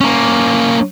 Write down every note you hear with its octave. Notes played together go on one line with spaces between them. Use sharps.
A#3 C#4